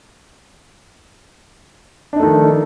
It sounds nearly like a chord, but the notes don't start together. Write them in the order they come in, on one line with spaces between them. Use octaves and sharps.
D4 D#4 A3 D#3 F3